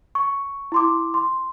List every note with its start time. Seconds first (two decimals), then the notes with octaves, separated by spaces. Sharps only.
0.15 C#6
0.72 E4 C6 D6
1.14 C6